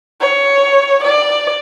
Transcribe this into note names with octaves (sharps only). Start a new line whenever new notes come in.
C#5
D5